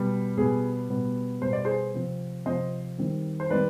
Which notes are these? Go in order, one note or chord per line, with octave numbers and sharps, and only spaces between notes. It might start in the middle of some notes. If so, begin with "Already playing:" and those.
Already playing: B2 G3 B3
B2 G3 B3 G#4
B2 G3 B3
B2 G3 B3 C5
D5
G#4 C5
C3 F3 C4
C3 F3 C4 C5 D#5
D#3 G3 C4
C5
D#3 G3 C4 B4 D5